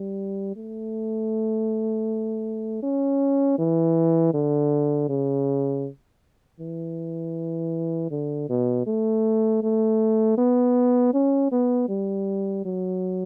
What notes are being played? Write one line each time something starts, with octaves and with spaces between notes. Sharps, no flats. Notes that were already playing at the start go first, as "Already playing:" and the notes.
Already playing: G3
A3
C#4
E3
D3
C#3
E3
D3
B2
A3
A3
B3
C#4
B3
G3
F#3